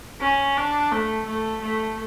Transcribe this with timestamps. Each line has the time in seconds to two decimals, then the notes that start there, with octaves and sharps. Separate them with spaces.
0.21 C#4
0.57 D4
0.92 A3
1.26 A3
1.62 A3